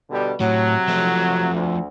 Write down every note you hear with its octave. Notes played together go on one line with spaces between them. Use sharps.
B2 D3 G3
A2 C3 F#3
F3 A3
D2